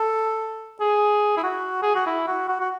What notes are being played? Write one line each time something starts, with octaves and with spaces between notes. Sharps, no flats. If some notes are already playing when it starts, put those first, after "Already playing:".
Already playing: A4
G#4
E4
F#4
G#4
F#4
E4
F#4
F#4
F#4